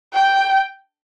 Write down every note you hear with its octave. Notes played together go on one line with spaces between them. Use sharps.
G5